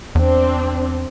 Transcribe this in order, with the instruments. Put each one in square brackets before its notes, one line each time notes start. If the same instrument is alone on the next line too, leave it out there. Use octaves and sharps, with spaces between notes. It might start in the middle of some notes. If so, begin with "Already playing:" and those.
[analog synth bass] E2 [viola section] C4 D4